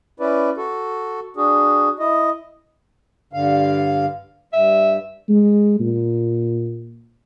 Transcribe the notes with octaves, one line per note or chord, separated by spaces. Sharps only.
C#4 E4 B4 D5
F#4 A4
D4 F#4 G#4
E4 D#5
G2 D3 F5
G2 E5
G#3
A#2